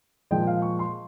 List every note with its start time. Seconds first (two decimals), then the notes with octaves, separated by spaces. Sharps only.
0.31 A#2 F3 G#3 G5
0.47 F5
0.62 C#6
0.79 C6